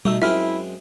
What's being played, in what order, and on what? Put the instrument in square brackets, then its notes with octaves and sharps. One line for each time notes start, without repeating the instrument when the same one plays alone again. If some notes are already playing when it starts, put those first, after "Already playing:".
[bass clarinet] B2 [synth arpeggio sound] G3 E5 E6 [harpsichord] A3 D#4
[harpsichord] F#2 G#3 C4 [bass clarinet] E4 [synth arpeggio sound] F4 [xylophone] E5 F6